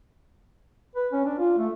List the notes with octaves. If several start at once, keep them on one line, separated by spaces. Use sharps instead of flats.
B4
C#4
D4
F4
A3